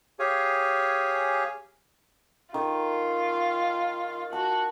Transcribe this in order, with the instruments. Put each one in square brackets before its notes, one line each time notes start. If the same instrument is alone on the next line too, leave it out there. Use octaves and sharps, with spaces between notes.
[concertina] G4 G#4 C#5 F5 G#5
[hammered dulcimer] D#3 [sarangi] F4
[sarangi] F#4 [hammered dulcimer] A5